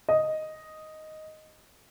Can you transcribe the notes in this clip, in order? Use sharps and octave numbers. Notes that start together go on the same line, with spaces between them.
D#5